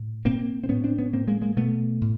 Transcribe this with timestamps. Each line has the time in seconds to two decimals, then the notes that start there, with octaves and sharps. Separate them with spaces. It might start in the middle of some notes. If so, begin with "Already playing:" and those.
Already playing: A2
0.25 A#2 A#3 C4
0.64 C4
0.69 A2 B3 C#4
0.84 C4 D4
0.98 B3 C#4
1.13 A2 A#3 C4
1.28 G#3 A#3
1.42 G#3 A#3
1.57 B2 A3 B3
2.01 A2